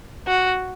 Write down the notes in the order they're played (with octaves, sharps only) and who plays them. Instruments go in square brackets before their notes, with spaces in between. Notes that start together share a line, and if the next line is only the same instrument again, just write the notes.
[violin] F#4